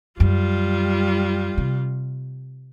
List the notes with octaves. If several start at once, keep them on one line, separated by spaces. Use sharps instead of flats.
F#2 G3 F4
C3